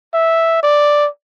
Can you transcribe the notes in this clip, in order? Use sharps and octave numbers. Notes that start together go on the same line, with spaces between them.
E5
D5